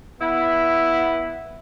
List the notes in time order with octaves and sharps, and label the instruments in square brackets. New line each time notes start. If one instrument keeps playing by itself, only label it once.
[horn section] B3 E4